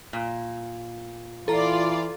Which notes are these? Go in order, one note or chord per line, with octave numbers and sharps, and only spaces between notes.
A#2
E3 F4 A4 D5 A#5